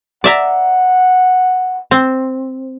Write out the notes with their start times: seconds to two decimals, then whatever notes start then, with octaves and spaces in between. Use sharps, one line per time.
0.24 D5 E5 F#5 A#5
1.91 C4